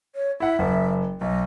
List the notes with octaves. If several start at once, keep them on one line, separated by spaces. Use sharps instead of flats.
C#5
E4 E5 F#5
F#1
B1 D#5